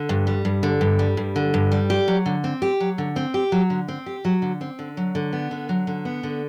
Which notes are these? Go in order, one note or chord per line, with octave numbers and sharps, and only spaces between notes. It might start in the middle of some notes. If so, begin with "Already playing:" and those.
Already playing: D3
G2
G3
G2
D3
G2
G3
G2
D3
G2
G3
G4
F#3
D3
C4
G4
F#3
D3
C4
G4
F#3
D3
C4
G4
F#3
D3
C4
D3
F#3
D3
B3
D3
F#3
D3
B3
D3